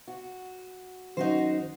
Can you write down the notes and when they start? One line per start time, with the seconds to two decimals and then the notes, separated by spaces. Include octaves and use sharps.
0.08 F#4
1.17 D#3 F#3 C#4 D#4 F#4 C5